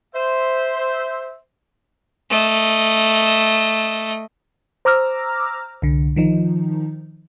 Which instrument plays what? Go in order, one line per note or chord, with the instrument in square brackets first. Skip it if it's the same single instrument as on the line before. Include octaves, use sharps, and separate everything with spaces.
[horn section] C5 E5
[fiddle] A3 D#5
[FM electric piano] C5 A#5 D6 E6 F6 A#6
C2 D3
D#3 F3 D#4